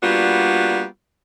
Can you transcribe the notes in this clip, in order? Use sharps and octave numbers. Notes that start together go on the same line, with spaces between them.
G3 A#3 B3 D4 F4 F#4